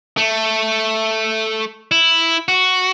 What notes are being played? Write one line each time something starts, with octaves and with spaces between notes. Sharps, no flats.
A3
E4
F#4